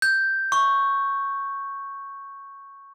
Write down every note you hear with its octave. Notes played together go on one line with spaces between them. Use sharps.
G6
C#6